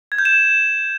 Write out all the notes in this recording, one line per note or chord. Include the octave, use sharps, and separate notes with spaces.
G#6
G6
E7